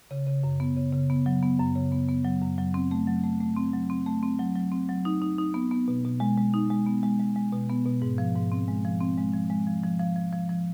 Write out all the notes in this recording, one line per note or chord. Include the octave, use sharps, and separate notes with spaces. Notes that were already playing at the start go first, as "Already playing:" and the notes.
C#3
C#3
F#2
B3
C#3
C#3
B3
F#3
B3
F#2
C#3
B3
B3
F#3
F#2
F#3
C4
A3
F#3
A3
A3
C4
F#3
C4
A3
C4
F#3
F#3
C4
F#3
D#4
D#4
D#4
B3
B3
B2
B2
G#3
G#3
D#4
G#3
B3
G#3
G#3
G#3
B2
B3
B2
G#2
F3
G#2
C4
G#3
F3
C4
G#3
F3
G#3
F3
F3
F3
F3
F3
F3